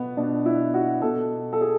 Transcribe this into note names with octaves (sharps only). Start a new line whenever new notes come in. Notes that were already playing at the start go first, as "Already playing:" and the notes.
Already playing: B2 B3
B2 D4
E4
F#4
B2 A4
A4
G#4